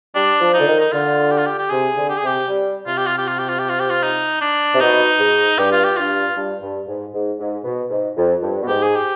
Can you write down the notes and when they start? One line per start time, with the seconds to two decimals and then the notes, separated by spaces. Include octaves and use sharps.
0.15 G3 D4
0.41 F3
0.54 D#4
0.60 D3
0.67 D#3
0.80 D#4
0.92 D3 F4
1.31 G4
1.38 F4
1.46 G4
1.59 G4
1.70 C3 G#4
1.96 D3
2.10 G4
2.17 G#4
2.22 C3 G4
2.48 G3
2.87 C3 F4
2.97 G4
3.07 F4
3.18 G4
3.28 F4
3.39 G4
3.49 F4
3.59 G4
3.69 F4
3.80 G4
3.90 F4
4.03 D#4
4.41 D4
4.74 C3
4.80 B2 D#4
5.20 G#2
5.58 G2 G4
5.72 F4
5.84 G4
5.97 G2 F4
6.36 G2
6.62 G2
6.88 G#2
7.14 G#2
7.40 G#2
7.65 B2
7.90 G#2
8.17 F2
8.42 G2
8.63 B2
8.68 G#2 G4
8.82 G#4
8.95 G4